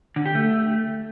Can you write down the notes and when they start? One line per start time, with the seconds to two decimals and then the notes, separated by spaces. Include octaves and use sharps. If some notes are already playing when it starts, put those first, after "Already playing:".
0.16 D3
0.26 G4
0.35 A3